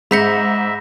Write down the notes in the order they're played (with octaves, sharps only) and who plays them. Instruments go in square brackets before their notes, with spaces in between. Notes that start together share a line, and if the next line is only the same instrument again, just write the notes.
[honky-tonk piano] G#2 [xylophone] G#4 B6 C#7 [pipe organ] E5 [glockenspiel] B5 G6 A#6